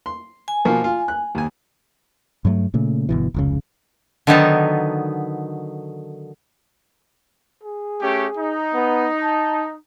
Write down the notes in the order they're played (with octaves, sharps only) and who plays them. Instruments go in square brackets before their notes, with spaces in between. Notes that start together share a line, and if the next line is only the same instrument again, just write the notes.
[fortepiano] C6
[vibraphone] G#5
[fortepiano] B2 F3 A#3
F4
F#6
D#2 G#5
[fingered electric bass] G2 F#3 G#3 A3
A#2 C#3 A3
G1 B2 E3
F1 C#2 C#3
[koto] D3 D#3 F#3 B3 D#4 A5
[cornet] G#4
[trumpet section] A3 C#4 G4
D#4
[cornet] B3
A5